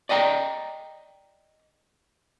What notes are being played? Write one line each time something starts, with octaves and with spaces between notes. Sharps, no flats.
D5 D#5 G5 A5 A#5